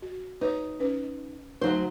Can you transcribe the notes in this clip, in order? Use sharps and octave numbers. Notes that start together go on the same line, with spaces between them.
F#4
D#4 B4 C#5
C#4 B4
D2 F#3 D#4 C5